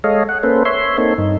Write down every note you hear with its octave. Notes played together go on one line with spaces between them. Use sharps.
G#3 A4 C#5 D#5 F5
F#5
A#3 C#4 A4 B4 C5
C#5 E5 C6
A#3 C4 D#4 A4 C#5
G2 D#4